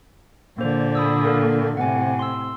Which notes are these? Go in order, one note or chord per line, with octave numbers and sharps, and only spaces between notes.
A#2 D3 A#3 C5
B5 D#6 E6
A#3 A4 A#4
A2 C3 F#5 G#5
C6 E6